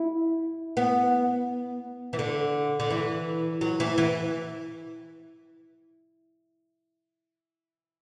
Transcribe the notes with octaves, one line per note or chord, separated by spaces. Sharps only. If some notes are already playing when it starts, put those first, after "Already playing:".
Already playing: E4
B3
E3
D3
D3
E3
F#3
E3
E3